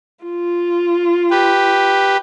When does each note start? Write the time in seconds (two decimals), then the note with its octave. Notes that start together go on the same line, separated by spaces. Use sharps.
0.25 F4
1.31 G4 B4